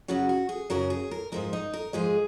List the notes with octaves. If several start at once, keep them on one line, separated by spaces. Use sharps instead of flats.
F#2 C#3 F#3 F#4
F#4
G#4
F#2 C#3 F#3 A#4
G#4
A#4
G#2 F3 G#3 A#4
D#4
A#4
G#2 F3 G#3 G#4